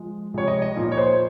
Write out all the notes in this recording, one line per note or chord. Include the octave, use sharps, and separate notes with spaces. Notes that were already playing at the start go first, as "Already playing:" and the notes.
Already playing: F3 G#3
C3 F3 G#3 C#5
D#5
D#5
A#2 F3 A#3
C#5
C5